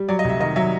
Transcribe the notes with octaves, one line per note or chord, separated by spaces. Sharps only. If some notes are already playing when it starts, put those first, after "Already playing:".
Already playing: G3
F#3 D5
D#5
F1
E5
D#3 D#5
F#3 E5